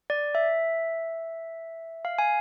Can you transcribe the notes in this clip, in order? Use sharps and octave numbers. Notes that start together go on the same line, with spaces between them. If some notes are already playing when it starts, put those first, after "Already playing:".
D5
E5
F5
G#5